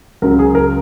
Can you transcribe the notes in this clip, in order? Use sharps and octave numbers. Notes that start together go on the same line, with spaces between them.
C#2 C#3 F#3 A#4
G#4
A#4